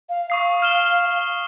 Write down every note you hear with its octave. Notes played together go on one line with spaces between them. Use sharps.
F5
F5 C#6 D#6 C7
F6 E7 G7